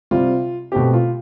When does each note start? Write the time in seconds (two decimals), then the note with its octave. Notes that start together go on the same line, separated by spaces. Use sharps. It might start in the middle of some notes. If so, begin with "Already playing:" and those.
0.11 C3 G3 C4 F4
0.72 B2 A3 C4 G4
0.93 F4